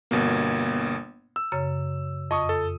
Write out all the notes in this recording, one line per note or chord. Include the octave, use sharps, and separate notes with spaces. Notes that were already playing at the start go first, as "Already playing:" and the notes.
G1 B2 A#3
E6
F#2 C#3 C#5
F2 D#5 C#6 D#6
A4